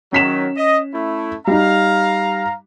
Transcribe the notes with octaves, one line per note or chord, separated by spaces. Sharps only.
D#3 F#3 C#4 B6 E7
D#5
A3 E4
G3 D#4 F5 A#5